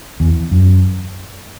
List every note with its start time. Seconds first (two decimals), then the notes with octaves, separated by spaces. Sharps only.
0.20 E2
0.51 F#2